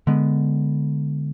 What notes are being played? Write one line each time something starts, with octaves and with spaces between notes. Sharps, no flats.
D3 G#3 B3